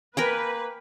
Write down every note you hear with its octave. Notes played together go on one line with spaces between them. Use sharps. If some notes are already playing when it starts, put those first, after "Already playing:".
A#3 A#4 B4 G5 G#5